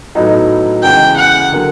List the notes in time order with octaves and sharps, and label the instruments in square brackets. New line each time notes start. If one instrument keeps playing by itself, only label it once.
[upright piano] A2 F#3 B3 D#4 F#4
[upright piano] E2 C#3 E3 G#3 [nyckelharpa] G5
[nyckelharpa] F#5
[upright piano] D3 F#3 A#3